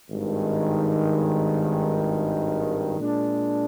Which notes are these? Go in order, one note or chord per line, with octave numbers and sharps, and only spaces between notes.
G#1 G2 D#3 G#3
A#2 G#3 D4